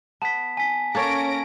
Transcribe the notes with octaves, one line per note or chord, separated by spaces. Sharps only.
B3 A5 B6
G#5 B6
A#3 C#4 A4 C#5 A#6 D7